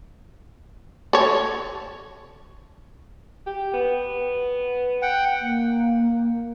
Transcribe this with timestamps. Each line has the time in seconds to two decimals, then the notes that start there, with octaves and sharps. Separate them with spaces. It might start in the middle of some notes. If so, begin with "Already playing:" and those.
1.13 A4 C#5
3.47 G4
3.73 B3
5.02 F#5 G5
5.41 A#3